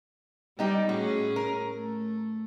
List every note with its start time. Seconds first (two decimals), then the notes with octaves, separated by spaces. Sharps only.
0.59 G3 B3 D#4 G4
0.89 A2 C#4 F#4 G#4
1.36 A#4
1.74 A3